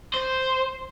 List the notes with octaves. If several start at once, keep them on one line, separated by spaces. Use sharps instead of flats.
C5